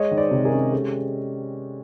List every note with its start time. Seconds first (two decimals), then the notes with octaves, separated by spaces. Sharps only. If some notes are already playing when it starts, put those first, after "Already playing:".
Already playing: G#3 C#5 D#5
0.11 D#3
0.17 C5 D5
0.31 C3
0.45 G#4 A#4
0.52 C#4
0.73 G#3 G4 A4